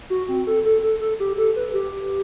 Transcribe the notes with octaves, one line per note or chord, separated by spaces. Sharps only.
F#4
C4
A4
A4
A4
A4
G4
A4
B4
G4